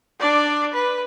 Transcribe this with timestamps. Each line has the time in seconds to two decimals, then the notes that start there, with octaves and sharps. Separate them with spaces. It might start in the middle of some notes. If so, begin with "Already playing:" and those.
0.20 D4 D5
0.73 B4